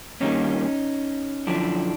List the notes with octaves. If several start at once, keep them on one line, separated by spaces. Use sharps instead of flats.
G2 D#3 G3 A#3 C#4 D#4
F#2 D3 F3 D4 E4